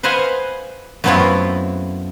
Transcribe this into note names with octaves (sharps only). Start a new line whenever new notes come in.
B4 C5 D#5 F5 F#5 G#5
F#2 A3 B3 C4 E4 F4